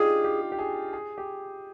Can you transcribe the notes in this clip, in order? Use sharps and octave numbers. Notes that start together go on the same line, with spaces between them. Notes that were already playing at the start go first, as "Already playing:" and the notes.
Already playing: D4 D#4 F4 G4 G#4
G4
G4
G#4
G#4
G4